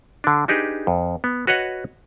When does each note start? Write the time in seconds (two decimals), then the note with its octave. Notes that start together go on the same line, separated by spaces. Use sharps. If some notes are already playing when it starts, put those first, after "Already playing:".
0.24 D3 D4
0.48 D4 D#4 G4 G#4 B4
0.87 F2
1.24 B3
1.47 F#4 B4 C#5 D#5 F#5